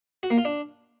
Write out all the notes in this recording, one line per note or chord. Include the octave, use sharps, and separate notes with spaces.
F#4
A#3
F4
D4